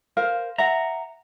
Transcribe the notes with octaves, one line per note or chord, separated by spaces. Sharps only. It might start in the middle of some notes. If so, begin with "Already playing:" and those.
A#4 C5 F5
E5 F#5 A#5